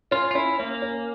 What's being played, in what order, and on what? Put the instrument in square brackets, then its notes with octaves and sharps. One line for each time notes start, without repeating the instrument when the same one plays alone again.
[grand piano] C#4 [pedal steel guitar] F4
[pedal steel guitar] F4
[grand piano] C#4 [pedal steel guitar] E4
[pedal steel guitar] A#3 [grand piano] C#4
[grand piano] C#4